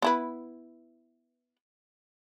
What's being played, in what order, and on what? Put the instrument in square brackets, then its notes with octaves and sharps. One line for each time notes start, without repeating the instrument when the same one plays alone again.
[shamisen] B3 E4 B4